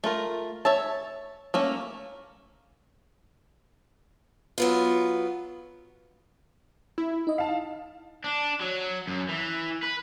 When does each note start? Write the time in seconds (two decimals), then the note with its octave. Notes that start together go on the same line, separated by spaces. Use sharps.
0.04 A3 F4 A#4
0.65 C#5 E5 A5
1.54 A3 A#3 C#4
4.58 F#3 B3 F4
6.98 E4
7.27 D#4 D#5
7.38 F5 A5
8.24 D4
8.60 F#3
9.07 F#2
9.29 E3
9.83 B4